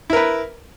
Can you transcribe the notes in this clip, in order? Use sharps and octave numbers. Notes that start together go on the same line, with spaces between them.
E4 A#4 B4